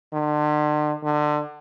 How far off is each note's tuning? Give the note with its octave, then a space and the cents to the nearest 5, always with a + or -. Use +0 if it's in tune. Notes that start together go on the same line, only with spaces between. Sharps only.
D3 +40
D3 +25